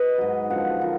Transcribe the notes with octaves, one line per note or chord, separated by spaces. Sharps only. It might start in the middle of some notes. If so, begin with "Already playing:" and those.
Already playing: B4 D#5
G#2 F#3
F#2 D3 F3 F#5
D3 F3 A#4